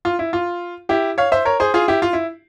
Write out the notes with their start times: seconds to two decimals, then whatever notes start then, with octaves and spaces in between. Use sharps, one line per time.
0.05 F4
0.19 E4
0.33 F4
0.89 E4 G4
1.18 C#5 F5
1.32 C5 E5
1.45 A#4 C#5
1.60 G#4 C5
1.74 F4 G#4
1.88 E4 G4
2.02 F4
2.13 E4